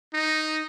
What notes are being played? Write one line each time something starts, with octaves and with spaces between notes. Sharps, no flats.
D#4